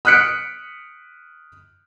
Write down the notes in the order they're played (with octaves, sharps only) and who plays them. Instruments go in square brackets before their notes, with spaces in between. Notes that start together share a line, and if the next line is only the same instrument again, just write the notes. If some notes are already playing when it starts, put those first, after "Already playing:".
[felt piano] D#6 F6 F#6 B6 C#7 D7